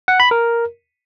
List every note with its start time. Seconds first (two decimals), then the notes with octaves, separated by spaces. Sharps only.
0.08 F#5
0.20 B5
0.31 A#4